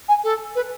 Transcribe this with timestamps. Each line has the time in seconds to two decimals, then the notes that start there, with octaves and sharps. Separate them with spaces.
0.09 G#5
0.24 A4
0.55 B4